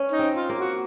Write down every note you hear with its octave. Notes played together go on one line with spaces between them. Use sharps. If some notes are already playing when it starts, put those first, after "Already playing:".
Already playing: C#4
D#4
C4
F4
A#3
F#4